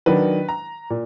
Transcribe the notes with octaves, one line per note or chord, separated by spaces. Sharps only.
D#3 F#3 D4 B4
A#5
A#2